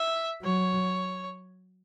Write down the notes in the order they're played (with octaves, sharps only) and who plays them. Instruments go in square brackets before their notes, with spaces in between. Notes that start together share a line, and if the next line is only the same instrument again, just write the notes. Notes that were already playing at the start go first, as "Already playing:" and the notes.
Already playing: [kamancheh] E5
[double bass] F#3 [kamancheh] C#5